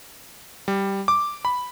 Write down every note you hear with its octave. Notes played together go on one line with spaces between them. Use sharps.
G3
D6
B5